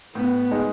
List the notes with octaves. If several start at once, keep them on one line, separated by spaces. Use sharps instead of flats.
A2 B3
G#3 D#4 G#4